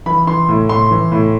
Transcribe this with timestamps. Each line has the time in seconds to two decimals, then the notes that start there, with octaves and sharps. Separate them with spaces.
0.06 E3 B5
0.27 E3 C6
0.49 A2
0.69 A2 C6
0.91 E3
1.12 A2